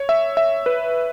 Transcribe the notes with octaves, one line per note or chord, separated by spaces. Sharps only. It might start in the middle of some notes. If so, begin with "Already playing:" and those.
Already playing: C#5
E5
E5
B4